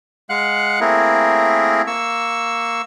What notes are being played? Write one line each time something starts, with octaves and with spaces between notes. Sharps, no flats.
G#3 F5 F#5 F#6
A3 A#3 C4 E4 G#4 A#4
A#3 C#6 E6